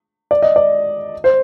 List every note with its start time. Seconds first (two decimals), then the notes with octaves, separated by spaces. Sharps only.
0.31 D5
0.42 D#5
0.56 D5
1.24 C5